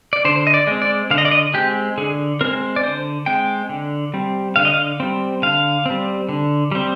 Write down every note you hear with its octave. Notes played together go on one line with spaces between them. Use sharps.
D5
D3 C5
D#5
D5
G#3 C4
D5
D3 F5
D#5
D5
D#5
G#3 C4 G4
D3 G#4
G#3 C4 A#4
D5
D3 C5
G#3 C4 G5
D3
G3 C4
D3 F5
D#5
F5
G3 C4
D3 F5
G3 C4
D3
G3 C4